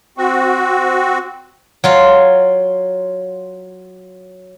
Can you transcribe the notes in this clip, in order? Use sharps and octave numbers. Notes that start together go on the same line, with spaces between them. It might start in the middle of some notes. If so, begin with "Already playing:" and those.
C4 F#4
F#3 F4 F5